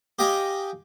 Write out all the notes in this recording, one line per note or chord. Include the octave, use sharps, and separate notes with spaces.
G4 D#5 F5 G5 G#5